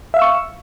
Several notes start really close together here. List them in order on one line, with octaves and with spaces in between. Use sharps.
E5 F5 E6 C#6